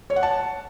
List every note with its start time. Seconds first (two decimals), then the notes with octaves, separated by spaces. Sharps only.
0.10 C#5
0.16 F#5
0.23 A5